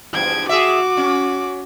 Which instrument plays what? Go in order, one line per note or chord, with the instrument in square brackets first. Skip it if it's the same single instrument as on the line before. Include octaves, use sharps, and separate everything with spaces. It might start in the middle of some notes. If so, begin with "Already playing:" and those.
[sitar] E2 G2 F3 [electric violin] G#6 D7
[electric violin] F#4 D6 [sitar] G#4 E5
[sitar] C#4